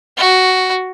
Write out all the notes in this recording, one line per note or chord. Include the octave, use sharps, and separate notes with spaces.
F#4